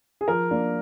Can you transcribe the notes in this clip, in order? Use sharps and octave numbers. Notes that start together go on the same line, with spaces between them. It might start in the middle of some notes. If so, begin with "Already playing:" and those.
G#4
F3 A#4
A#3 D4